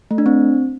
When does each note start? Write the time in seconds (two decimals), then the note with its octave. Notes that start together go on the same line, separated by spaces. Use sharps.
0.11 A3
0.18 D4
0.26 C4